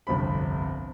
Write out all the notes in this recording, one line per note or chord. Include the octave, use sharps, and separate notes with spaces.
G1 C2 F2 C4 B5